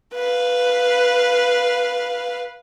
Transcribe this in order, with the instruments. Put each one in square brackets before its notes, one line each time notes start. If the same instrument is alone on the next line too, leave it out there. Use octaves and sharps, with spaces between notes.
[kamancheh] B4 F5